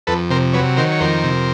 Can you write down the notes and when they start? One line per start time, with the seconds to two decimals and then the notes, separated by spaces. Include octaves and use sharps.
0.07 F2 A4 B4
0.30 C3 A#4 C5
0.53 F#3 B4 C#5
0.77 D#3 A#4 C5
0.92 C#5
1.00 F2 A#4 C5
1.24 C3